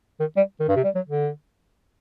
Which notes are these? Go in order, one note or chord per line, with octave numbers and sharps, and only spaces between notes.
D#3
G3
D#3
G2
C3
G3
F#3
D3